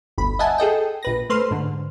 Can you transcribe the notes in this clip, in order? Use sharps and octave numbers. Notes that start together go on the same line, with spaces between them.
G1 D2 B5
D#5 E5 F#5 G#5 A5
G#4 A4 D#5 G5
A#1 B4 A#6
A3 B4 C5 C6 F6
G#2 D3